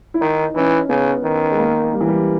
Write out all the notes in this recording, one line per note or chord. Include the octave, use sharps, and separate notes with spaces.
E4
D#3 D#4
E3 C#4
C#3 B3
D#3
G#3
A#3
G3
E3
G3